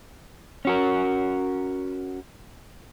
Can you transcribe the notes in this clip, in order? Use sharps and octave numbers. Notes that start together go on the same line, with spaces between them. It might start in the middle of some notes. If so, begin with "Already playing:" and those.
C#4 F#4 A#4